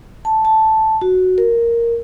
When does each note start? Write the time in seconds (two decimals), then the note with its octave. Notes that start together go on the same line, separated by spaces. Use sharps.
0.25 A5
0.45 A5
1.01 F#4
1.38 A#4